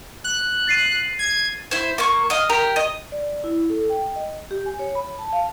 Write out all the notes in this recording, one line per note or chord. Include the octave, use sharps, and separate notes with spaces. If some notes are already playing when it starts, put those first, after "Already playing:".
F#6
A6 C7 D#7
G#6
E4 C5
A#3 C#6
D#5 F5
G4 A#4 A#5
D#5
D5
E4
A4
G5
D#5
G4
G#5
C#5
B5
A5
F5